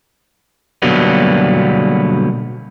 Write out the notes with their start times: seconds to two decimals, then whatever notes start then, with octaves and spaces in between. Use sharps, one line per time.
0.82 B2 D3 F#3 G3 A#3 B3